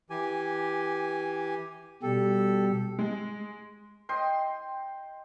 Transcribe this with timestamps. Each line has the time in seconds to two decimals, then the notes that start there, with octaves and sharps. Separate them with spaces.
0.10 E3 G4 G#5
2.03 B2 G3 G4 A4
2.99 G#3
4.09 D#5 G5 C6